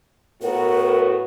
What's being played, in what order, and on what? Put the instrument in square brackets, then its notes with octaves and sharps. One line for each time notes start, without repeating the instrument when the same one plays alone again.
[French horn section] A2 B3 F#4 [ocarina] A#4